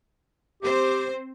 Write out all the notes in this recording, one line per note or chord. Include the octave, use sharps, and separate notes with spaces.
C4 G4 C5